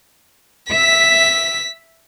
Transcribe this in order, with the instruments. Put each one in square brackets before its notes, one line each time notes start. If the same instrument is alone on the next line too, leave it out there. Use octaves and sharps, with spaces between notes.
[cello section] E5 [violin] B6